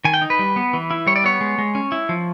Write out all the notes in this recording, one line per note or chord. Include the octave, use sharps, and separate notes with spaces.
D#3 G#5
G5
D#4
B4
G3
B3
E3
E4
G3 C#5
D5
B3 C#5
G#3
G#3
C#4
E4
F3